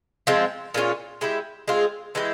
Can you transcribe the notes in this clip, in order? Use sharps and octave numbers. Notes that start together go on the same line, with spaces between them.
F3 G#3 C4
A#2 G#3 C#4 F4
G#3 E4 G4
G#3 C4 F4 G#4
E3 G#3 E4 G4